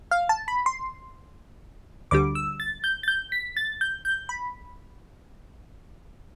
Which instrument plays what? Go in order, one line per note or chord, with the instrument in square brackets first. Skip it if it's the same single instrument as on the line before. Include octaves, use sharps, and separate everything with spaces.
[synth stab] F5
A5
B5
C6
D2 D3 G3 D6
E6
A6
G6
A6
G6
B6
A6
G6
G6
B5